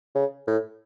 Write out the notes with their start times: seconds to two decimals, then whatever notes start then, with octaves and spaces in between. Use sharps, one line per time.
0.15 C#3
0.47 A2